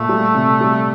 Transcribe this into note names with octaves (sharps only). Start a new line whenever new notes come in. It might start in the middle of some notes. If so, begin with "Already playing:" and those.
Already playing: A#2 A3
G3
C3
G3